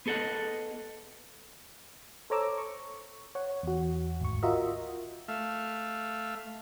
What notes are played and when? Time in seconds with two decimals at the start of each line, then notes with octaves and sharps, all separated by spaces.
0.06 B3 G#4 A4 D#5 F#5
2.30 A4 C5 C#5 A#5 D6 E6
2.58 C#6
3.35 C#5 F#5
3.63 E2 F#4
4.21 G#1 D2 C#6
4.43 F4 F#4 A#4 D#5 E5
5.28 A3 E5 F5